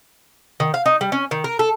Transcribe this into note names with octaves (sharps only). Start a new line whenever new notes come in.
D#3
F5
D#4
G3
C#4
D#3
A#4
A4